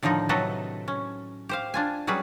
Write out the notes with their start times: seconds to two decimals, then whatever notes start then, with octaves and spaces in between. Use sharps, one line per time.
0.03 A2 D3 D#3 F3 D#4
0.29 C3 F#3 A4 B4 D#5
0.88 C#4
1.49 G4 C5 F5
1.74 D4 F4 G#5
2.07 F#3 G3 C#4 G#4 B4